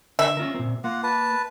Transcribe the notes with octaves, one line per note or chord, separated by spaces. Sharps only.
D3 E5
C#4 F4 A#4
A#2 C4
A#3 F4 F#5
B4 A5